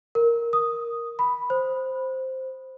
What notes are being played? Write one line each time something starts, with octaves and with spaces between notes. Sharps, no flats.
A#4
D#6
B5
C5